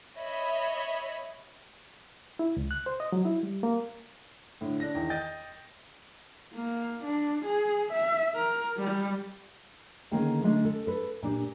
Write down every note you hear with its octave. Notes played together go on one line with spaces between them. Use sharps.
C#5 D#5 E5 B5
E4
C#2
F#6
C5
D#5
F#3
E4
G3
A#3
A2 D3
D4 A#6
E2 D#3
D#5 G5 D#6 G6 A6
A#3
D4
G#4
E5
A#4
G3
D3 D#3 A#3 C#4 G#4 G5
D3 G#3 A3 C#4 D4
A4
A4 B4
A#2 D4 G4